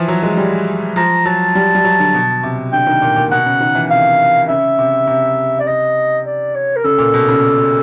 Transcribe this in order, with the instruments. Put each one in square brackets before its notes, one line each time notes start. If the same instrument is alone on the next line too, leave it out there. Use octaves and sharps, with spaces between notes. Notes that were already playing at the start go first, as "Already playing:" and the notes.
Already playing: [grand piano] E3 F3
F#3
G#3
G3
[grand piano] F3 [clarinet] A#5
[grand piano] F#3 [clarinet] A5
[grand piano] G3
G3
F#3
D3
B2
C3
[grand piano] D3 [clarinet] G5
[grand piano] D#3
A#2
A#2
[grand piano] B2 [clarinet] F#5
[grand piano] C#3
D#3
E3
[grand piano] C3 [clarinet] F5
[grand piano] C#3 [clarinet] E5
[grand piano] C3
C3
[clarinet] D5
D#5
D5
C#5
A#4
[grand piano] C#3 [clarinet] A4
[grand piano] A#2
B2
C#3